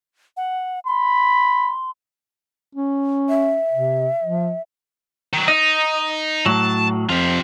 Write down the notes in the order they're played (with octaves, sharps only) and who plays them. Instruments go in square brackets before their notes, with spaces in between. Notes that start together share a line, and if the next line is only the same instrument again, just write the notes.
[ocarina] F#5
[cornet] B5 [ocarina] C6
[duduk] C#4
[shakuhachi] E5
[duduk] C3
F3
[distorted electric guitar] D#3 F#3
[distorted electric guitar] D#4 [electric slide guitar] D#5
[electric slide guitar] A2 F#3 [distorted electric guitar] A5
[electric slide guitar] F2 [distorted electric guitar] F4 G4